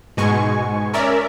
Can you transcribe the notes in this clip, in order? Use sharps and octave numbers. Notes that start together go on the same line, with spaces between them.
G#2 B2 G#3 G#5 C#6
C#4 A#4 D5 E5